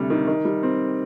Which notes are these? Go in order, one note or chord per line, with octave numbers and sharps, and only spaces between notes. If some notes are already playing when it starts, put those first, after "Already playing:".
Already playing: D2 C3 G3
D#3
D#3
G3
C4